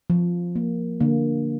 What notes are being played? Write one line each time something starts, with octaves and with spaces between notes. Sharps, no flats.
F3
A#3
D3 A#3